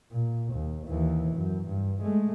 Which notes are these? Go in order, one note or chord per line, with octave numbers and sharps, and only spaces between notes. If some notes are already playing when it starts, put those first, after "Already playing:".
A#2
D#2
D#2 E3
F#2
G2
G#3 A3